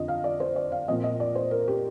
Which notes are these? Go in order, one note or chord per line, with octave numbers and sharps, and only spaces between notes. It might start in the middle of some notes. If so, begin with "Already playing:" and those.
Already playing: F2 D3 F3 D#5
F5
D5
C5
D5
F5
A#2 F3 C4 D#5
D#5
D5
C5
A#4
G4